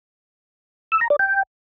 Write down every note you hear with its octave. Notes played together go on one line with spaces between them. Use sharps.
E6
A#5
D5
G5